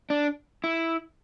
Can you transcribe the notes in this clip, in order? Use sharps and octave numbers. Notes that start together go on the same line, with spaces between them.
D4
E4